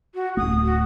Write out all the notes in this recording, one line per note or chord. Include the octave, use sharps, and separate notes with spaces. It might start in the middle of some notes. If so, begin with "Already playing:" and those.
F#4
D1 G#1 A3 D#6
F#4